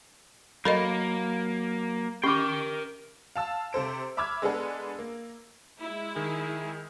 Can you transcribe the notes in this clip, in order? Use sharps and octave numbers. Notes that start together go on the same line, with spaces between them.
F#3 A#3 A4 A#4 D#5 B5
C#4 G4 A#4 G5 D6
F5 A5 E6
C3 A4 C5 D7
E5 B5 D6 E6 F6 G#6
G#3 B3 D4 G#4 A4 B4
A#3
G#3 E4
D#3 G#4